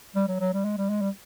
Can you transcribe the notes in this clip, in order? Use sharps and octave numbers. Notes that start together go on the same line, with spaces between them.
G3
F#3
F#3
G3
G#3
G3
G#3
G3